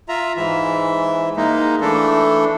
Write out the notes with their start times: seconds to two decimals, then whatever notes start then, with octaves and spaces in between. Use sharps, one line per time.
0.09 F4 E5 A#5
0.37 G#2 E3 E5
1.37 G#3 A#3 D#4
1.81 E3 A3 D4 A4